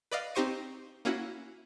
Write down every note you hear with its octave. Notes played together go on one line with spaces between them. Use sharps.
B4 D5 D#5 F5
C4 D#4 G4 C5 C#6 D#7
A#3 C#4 E4 F#4